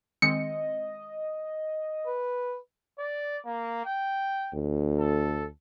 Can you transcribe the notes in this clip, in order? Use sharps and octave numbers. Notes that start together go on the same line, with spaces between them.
D#3 G#3 C4 D#5 C#7
B4
D5
A#3
G5
D2
A4